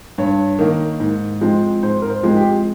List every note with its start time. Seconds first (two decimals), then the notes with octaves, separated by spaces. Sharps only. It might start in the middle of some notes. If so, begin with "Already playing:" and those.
0.18 G2 C#5
0.59 D#3 A#3
1.00 G#2
1.41 F3 G#3 C4
1.83 G#2 C5
2.02 A#4
2.09 C5
2.23 F3 G#3 C4
2.37 G4